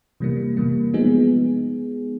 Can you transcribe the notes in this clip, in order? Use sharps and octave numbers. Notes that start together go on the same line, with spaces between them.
C3 E3 G3 A#3
C3 E3 G3 A#3
F3 G#3 B3 D#4 G#4